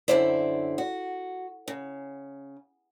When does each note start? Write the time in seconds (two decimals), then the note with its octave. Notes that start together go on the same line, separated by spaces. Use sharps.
0.08 F#2 D3 E3 E4 C5 D5
0.78 F#4
1.68 C#3